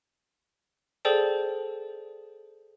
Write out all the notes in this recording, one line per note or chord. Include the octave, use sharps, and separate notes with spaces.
G#4 A4 C5 D5 G5 A5